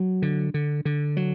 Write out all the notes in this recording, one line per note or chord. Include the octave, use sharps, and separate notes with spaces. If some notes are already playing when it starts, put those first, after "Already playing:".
Already playing: F#3
D3
D3
D3
F#3